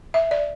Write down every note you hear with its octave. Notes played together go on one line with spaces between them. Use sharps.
E5
D5